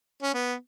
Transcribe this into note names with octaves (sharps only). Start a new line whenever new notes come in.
C#4
B3